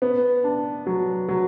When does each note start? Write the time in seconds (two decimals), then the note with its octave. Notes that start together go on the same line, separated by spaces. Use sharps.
0.02 B3
0.44 D4
0.86 F#3
1.28 F#3